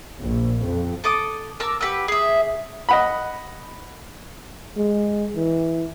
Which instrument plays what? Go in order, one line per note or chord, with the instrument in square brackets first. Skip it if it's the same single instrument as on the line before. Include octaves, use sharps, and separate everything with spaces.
[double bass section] A#1
F2
[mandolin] A4 A5 D6 D#6
A#4 A5 D6 E6
G4 B4 F#5 E6
G#4 E5
[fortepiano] D#5 F#5 B5
[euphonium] G#3
E3